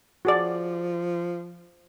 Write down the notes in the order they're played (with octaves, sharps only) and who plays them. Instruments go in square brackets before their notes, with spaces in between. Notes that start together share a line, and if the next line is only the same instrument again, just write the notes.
[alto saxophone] F3 [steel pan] F#4 G#4 D5